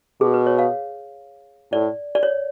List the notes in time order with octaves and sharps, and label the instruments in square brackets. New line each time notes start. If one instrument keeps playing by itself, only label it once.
[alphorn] B2 [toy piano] G#4
[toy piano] B4
C#5
F5
[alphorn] A2 [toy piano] D5
[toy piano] D5
C#5